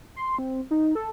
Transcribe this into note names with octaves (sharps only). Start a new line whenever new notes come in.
C6
C4
D#4
A4